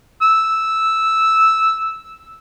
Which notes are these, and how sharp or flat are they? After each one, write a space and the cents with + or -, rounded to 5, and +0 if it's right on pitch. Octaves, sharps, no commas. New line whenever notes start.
E6 -5